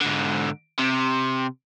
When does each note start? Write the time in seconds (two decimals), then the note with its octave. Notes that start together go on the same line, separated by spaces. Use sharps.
0.01 G#2 D3
0.79 C3